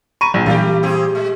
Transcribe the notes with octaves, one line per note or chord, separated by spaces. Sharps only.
A#5 B5 C#6 D#7
A#1 F#3
A#2 E3 G3 A3 G4
C4 G4 G#4
G#3